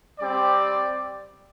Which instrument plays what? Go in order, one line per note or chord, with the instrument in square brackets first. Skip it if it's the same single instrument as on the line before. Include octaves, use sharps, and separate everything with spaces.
[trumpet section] G3 C4 G4 D5